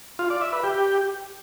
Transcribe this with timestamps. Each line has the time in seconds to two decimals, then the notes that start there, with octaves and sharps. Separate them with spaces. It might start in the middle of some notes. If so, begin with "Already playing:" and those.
0.19 F4
0.30 D5
0.41 E5
0.52 B4
0.64 G4